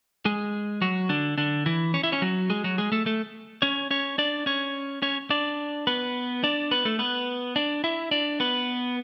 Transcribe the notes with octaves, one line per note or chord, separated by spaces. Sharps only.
G#3 G#4
F#3 F#4
D3 D4
D3 D4
E3 E4
C#4 C#5
E4 E5
C#4 C#5
F#3 F#4
G#3 G#4
F#3 F#4
G#3 G#4
A3 A4
A3 A4
C#4 C#5
C#4 C#5
D4 D5
C#4 C#5
C#4 C#5
D4 D5
B3 B4
D4 D5
B3 B4
A3 A4
B3 B4
D4 D5
E4 E5
D4 D5
B3 B4